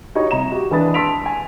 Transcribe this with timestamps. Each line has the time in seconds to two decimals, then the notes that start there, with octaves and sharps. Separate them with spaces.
0.15 D#4 F#4 G4 C#5
0.31 C2 A#5 E7
0.52 F#4 G4
0.71 E3 G#3 D4 B4 D#6 A6
0.94 A5 C6 E6 B6 D7 F7
1.26 G#5